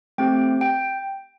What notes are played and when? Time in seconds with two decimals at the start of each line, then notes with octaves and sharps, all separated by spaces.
0.18 A3 C4 G4 G5
0.61 G5